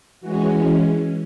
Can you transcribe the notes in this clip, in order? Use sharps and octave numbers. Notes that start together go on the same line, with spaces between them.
E3 G#3 C#4 F#4